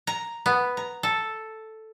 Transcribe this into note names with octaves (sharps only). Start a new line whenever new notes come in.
A#5
B3
A#5
A4